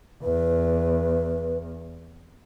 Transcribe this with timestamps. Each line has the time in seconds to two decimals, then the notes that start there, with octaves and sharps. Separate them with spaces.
0.22 E2 B4